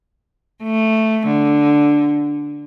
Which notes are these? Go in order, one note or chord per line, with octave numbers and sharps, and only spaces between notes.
A3
D3